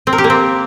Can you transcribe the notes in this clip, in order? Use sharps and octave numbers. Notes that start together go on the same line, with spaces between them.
C4
A#4
G4
A#3
C4